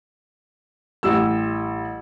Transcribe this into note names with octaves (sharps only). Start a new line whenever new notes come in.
A1 G3 E6